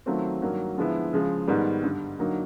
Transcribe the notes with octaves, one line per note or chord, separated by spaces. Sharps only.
D#3 F#3 A3 C4 F4
G2 D#3 F#3 A#3
D3 F3 G#3 B3 E4
C#3 F3 G#3
G#2 D#3 G3 B3
G2 D3 G3
D3 F#3 A#3 D#4